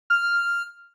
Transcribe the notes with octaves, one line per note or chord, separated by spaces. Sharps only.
F6